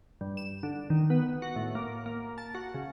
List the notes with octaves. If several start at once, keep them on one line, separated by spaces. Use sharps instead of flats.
G2
E7
D3
D#3
B3
F#4
A2
A#3
A#3
A5
F#4
C#3